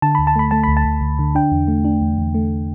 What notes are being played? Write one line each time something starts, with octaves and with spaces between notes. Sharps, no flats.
D3 A5
D2 B5
A5
A3 B5
A3 A5
D2 B5
A5
D2
D2
D3
D4 G5
E2
A3
D4
E2
E2
A3